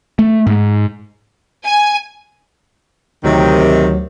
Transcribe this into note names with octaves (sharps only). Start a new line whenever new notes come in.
A3
G#2
G#5
D2 C3 D#3 F#3